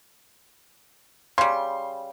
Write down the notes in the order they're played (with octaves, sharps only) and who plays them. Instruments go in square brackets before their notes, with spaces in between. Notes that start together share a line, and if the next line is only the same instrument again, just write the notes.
[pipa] C#3 G3 [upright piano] C6